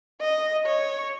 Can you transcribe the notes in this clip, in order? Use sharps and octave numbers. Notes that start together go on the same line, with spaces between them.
D#5
C#5